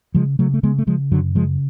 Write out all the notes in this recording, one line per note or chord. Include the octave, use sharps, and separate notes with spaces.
C#3 F3 G#3
C#3 F#3 A3
A3
C#3 G#3 B3
A3
C#3 F3 G#3
F#2 D3 F#3
C#3 F3 G#3